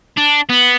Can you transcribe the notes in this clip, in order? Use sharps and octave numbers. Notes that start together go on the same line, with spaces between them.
D4
B3